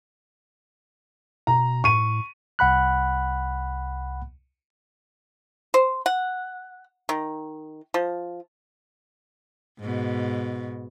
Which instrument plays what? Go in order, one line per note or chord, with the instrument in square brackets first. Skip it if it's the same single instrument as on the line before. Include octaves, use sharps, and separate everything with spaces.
[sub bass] B2 [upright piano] A#5
[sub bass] A2 [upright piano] C#6 D#7
[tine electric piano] C2 F#5 B5 F#6
[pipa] C5
F#5
D#3
F3
[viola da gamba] G#2 B2